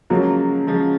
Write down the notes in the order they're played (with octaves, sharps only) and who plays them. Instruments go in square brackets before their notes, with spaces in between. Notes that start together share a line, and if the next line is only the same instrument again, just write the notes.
[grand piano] C#3 F3 G#3 [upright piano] F#3 A#3
[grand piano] C#3 F3 G#3